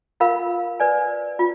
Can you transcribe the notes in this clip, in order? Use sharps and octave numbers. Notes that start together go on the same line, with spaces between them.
F4 A#4 F5 B5
B4 D5 G#5
F4